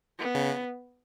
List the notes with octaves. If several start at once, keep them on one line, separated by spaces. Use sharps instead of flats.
B3
C#3